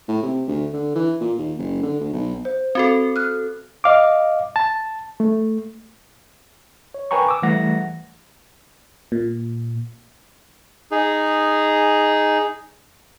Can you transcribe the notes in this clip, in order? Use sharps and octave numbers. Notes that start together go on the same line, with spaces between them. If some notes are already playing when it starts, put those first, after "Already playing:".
A2
C3
D2
D3
E3
A#2
D#2
F#1
D3
D2
B1
C5
C4 F#4 A4
F6 F#6
D#5 F5 D6
A5
A3
C#5
A#4 B4 G5 G#5 A#5 C#6
D6 E6
E3 G3 A3 F#5 A#6
A#2
D#4 G#4